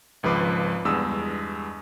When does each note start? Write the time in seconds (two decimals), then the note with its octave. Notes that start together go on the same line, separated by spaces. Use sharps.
0.23 G#1 C#2 F3 B4 D6 C7
0.85 E2 G2 G#3 D#6 E6